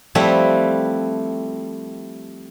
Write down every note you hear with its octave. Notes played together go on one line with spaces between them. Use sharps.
F3 G3 A3 C4 E4 B4